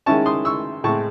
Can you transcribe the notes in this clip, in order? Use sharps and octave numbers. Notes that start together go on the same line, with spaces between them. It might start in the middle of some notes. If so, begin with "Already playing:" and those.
D#3 G#3 C#4 E4 A5 C#6
C6 D#6
C#6 E6
A2 G#3 C4 A5 C#6